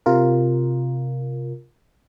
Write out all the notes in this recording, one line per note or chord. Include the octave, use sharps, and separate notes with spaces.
C3 F4 A#4